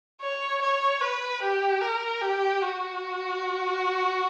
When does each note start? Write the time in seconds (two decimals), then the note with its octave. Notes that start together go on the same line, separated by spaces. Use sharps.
0.21 C#5
0.62 C#5
1.02 B4
1.42 G4
1.82 A#4
2.21 G4
2.62 F#4